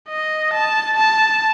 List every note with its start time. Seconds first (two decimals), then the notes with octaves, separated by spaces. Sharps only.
0.09 D#5
0.53 A5
0.97 A5